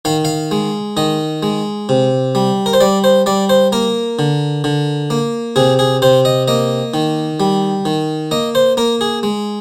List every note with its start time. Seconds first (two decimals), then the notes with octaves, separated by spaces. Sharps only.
0.05 D#3 F5
0.25 F5
0.51 G#3
0.97 D#3 D#5
1.43 G#3
1.89 C3
2.35 G3
2.66 A#4
2.73 C5
2.80 G3 D5
3.04 C5
3.26 G3 D5
3.49 C5
3.72 A#3 A#4
4.19 D3
4.64 D3
5.10 A#3
5.56 C3 G#4
5.79 G#4
6.02 C3 C5
6.25 D#5
6.48 A#3 D#5
6.94 D#3
7.40 G3
7.85 D#3
8.31 A#3 D#5
8.55 C5
8.77 A#3 A#4
9.01 G#4
9.23 G#3